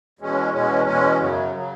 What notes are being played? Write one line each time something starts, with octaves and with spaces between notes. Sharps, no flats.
E2 B2 G#3 C#4
E2 B2 G#3 C#4
E2 B2 G#3 C#4
F#2 C#3 F#3
C#3 F#3